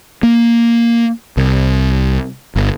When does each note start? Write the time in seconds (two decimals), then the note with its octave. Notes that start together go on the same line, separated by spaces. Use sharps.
0.23 A#3
1.37 C2
2.56 G1